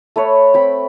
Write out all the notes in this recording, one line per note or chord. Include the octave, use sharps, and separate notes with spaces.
A3 B4 C#5
C4 G5 B5